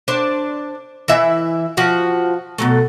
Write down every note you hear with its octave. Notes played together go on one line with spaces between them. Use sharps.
D4 C5
E3 E4 E5
F3 F#4
B2 F#3 A3